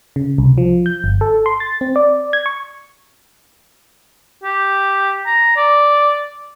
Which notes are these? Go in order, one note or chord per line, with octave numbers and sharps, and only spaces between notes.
C#3
C2
F3
G6
G1
A4
C6
A6
C4
D5
G#6
C#6
G4
A#5
D5